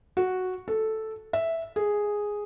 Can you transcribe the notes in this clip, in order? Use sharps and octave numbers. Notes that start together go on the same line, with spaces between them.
F#4
A4
E5
G#4